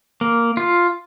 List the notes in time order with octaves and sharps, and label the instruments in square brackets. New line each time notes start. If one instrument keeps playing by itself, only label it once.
[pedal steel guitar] A#3
F4